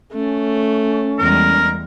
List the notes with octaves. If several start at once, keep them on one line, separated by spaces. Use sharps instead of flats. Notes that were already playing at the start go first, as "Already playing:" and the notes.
A3 C#4
E2 G3 G#3 A#4